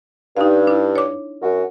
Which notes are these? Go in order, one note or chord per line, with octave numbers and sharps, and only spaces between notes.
G2 D#4 F5
D4 E4
C#5 D6
F#2 F#4